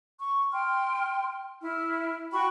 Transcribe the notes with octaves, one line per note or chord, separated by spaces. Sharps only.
C#6
G5 C6 F6
E4 F6
F#4 G5 B5 C#6